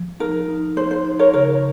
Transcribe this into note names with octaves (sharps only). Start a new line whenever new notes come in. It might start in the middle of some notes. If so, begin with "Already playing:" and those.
Already playing: F3
D#4 A#4
D#4
D#4 C5
C5
D#4
A#4 C#5
C#3 A#4 C#5